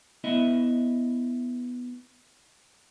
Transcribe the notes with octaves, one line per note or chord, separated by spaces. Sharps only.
B3 E4 D#5 E5